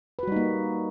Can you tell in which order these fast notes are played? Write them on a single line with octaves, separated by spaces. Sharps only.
B4 F#4 G3 D#4 A#3